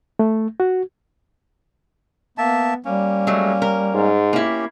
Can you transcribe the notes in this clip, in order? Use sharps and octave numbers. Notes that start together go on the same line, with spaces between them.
A3
F#4
A#3 B3 E5 A5
G3 A#3 C#4
F#3 G#3 A3
A#4
G#2
A#3 C#4 E4 G4